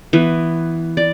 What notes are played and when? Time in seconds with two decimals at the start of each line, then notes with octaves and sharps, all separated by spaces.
0.13 E3 B3
0.97 D5